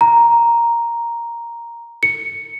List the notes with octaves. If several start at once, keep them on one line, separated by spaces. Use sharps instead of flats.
A#5
C#7